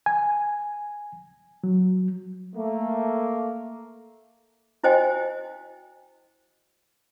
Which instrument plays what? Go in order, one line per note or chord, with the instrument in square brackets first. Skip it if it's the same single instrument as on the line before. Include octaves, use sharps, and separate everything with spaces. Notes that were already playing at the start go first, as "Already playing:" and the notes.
[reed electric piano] G#5
F#3
[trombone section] A3 A#3
[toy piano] E4 F#4 C5 D#5 G5 G#5